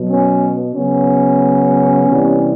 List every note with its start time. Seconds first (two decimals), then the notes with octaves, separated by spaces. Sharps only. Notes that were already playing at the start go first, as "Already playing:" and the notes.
Already playing: B2 F#3
0.09 B3 C#4
0.75 C#3 F#3 B3 C#4
2.08 C3 E3 G3